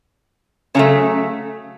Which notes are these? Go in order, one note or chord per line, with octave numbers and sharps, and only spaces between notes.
C#3 F#3 A3 C#4